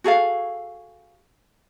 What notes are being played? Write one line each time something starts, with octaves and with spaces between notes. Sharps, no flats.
F#4 G#4 A4 F5